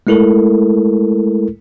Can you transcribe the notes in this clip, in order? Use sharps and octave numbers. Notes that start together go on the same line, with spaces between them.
G#3 A3 E4 A4 A#4